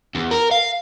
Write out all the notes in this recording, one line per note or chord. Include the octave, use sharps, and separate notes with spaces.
E2
A#4
F5